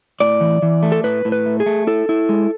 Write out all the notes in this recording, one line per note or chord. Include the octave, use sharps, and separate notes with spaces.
A2 D5
E3
E3
A3
A4
A2 B4
A2
B4
A3
G#4
A3
E4 A4
E4
G#3